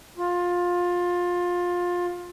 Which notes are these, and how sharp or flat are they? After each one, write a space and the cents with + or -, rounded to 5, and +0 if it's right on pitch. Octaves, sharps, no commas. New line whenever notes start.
F4 +20